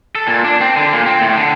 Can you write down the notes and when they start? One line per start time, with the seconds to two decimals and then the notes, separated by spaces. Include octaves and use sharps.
0.15 A4
0.27 A#2
0.45 D4
0.61 C4
0.76 D3
0.93 A#2
1.06 C4
1.21 A2
1.36 D3